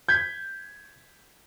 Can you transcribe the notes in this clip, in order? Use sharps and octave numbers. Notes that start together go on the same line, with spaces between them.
G6 G#6 B6